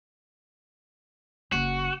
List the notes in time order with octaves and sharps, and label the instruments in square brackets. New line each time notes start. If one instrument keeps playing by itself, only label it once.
[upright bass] F#1 [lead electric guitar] F#4